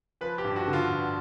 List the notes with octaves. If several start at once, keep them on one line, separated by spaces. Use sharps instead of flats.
F3 B4
G4
G2
F#4
D3
F4
G2